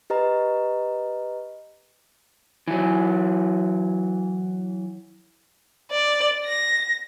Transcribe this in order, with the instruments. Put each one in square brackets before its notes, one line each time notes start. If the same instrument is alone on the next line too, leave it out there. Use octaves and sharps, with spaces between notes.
[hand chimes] G4 B4 D#5 A#5
[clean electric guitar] E3 F#3
[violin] D5
A#6